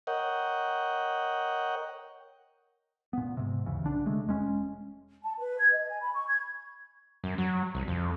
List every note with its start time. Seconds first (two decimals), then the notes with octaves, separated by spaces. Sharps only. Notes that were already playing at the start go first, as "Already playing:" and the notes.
0.07 A#4 C#5 D#5 F#5 G5
3.13 A#2 B3
3.37 G#2 C3
3.66 D#2 G#2 C#3 E3
3.82 B1 D3 D4
4.06 C3 G#3 A3
4.27 E1 G#3 C#4
5.24 A5
5.38 B4
5.58 G#6
5.72 D#5
5.89 G#5
6.01 B5
6.14 C#6
6.27 G#6
7.24 F#2
7.38 F#3
7.75 C2
7.88 F2